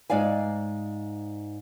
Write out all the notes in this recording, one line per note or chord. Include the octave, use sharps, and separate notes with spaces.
G#2 D#4 D5 F5 G#5